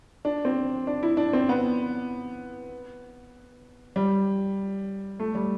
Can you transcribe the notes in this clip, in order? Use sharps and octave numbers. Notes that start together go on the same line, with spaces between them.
D4
C4
D4
E4
D4
C4
B3
G3
A3
G3